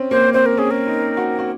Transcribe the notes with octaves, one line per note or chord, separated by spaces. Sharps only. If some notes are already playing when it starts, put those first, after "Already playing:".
Already playing: C4 C#4
A#3 C5
C4 C5
A#4
C#4 G#4
A#4
D#4
F#4
F#4